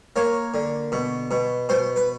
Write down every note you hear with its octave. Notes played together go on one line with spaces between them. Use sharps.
A#3 C#5
D3
B2
B2
B2 C5
B4